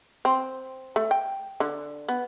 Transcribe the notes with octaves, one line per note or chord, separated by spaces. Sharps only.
C4
A3
G5
D3
B3